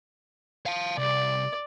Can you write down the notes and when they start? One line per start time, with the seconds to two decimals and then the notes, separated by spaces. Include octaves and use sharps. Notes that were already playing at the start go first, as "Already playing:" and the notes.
0.66 F5 A5
0.98 C2 D5